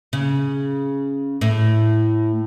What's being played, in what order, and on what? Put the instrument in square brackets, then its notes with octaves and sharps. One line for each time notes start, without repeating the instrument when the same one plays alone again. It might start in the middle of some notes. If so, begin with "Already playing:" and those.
[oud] C#3
A2